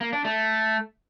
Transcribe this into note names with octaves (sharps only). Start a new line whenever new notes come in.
A#3
D4
A3